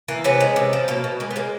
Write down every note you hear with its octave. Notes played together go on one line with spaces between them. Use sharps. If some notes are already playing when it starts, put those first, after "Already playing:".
E3 A#3
C3 B3 C#4
G#3
C3
F3
B2 A#3
B2
G#3 A#3
B3
G#3 A#3